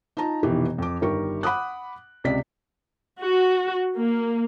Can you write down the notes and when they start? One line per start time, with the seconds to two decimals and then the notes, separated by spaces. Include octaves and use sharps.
0.17 D#4 F4 A5 A#5
0.43 F1 B2 D#3 E3 G4
0.78 F2 D6
1.01 G1 D#3 G3 G4 A#4 C#6
1.43 F#5 B5 D6 D#6 F#6
2.24 C#2 C3 D5 B6
3.21 F#4
3.96 A#3